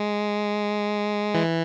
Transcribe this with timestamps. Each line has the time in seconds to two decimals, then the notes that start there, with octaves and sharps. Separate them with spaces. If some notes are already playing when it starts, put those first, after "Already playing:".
Already playing: G#3
1.34 E3